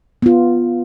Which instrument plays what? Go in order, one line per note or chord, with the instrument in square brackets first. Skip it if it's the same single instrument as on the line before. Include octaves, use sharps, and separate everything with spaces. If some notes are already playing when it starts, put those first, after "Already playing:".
[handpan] B3 F4